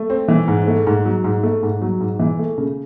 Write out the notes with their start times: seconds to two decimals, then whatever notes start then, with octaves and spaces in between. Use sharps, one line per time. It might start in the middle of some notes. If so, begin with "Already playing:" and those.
Already playing: A3
0.10 C4
0.28 E3
0.48 G#2
0.67 A3
0.87 G#2
1.05 F#3
1.24 G#2
1.43 A3
1.63 G#2
1.82 F#3
2.01 G#2
2.19 E3
2.39 A3
2.58 C#3